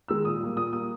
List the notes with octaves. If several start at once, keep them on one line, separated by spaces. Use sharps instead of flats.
D#3 G#3 E6
A#2 D#6
G3 A#3
A#2 D#6
G3 A#3 D#6